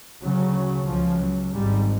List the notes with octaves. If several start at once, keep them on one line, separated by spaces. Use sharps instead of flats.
D2 C#3 F#3
C#2 C#3 F3
F#3
G#1 G#2 G3